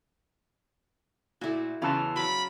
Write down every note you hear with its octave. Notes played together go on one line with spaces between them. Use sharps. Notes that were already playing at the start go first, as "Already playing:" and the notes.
A#2 A3 E4 F#4
E2 C#3 E3 F4 A5
F#3 D5 F5 B5